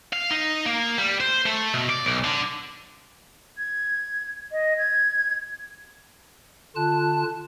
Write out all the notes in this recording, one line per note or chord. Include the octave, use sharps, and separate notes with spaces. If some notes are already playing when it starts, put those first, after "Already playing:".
F5
D#4
A#3
G3
C5
A3
B2
D5
B1
D3
G#6
D#5
G#6
D3 F4 A5 F#6